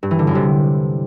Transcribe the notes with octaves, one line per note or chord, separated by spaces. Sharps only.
G2
E3
D3
F#2
C3